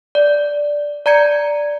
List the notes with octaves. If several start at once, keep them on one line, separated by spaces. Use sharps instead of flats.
D5
D5 A#5 G#6 C#7